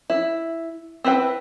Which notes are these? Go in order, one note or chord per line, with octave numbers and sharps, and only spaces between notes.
E4
C4 E4 B4 G5